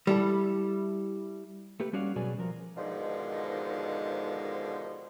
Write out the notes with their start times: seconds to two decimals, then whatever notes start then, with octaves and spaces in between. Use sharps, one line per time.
0.07 G3 E4 A4
1.80 A3 A#3 G4 B4
1.93 G3 C#4 F#4 D5 F5
2.16 B2 F#3 G#4 B4 D5 G#5
2.38 F3 A#4
2.77 G#2 B2 D3 D#3 F3 G#3